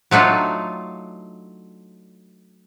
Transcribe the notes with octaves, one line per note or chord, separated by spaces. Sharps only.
F#3 A3 D4 D#4 F4